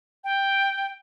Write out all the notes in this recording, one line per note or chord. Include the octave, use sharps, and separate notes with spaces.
G5